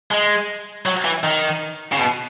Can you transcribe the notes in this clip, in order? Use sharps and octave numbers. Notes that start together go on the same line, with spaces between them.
G#3
F#3
E3
D#3
C#3
B2